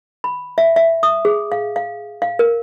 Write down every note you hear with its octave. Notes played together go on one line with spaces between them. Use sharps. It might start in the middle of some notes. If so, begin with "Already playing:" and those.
B5
E5
E5
D#6
G#4
F5
F5
F5
A#4